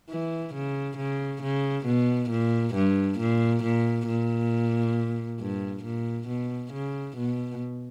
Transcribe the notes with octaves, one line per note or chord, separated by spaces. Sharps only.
E3
C#3
C#3
C#3
B2
A#2
G2
A#2
A#2
A#2
G2
A#2
B2
C#3
B2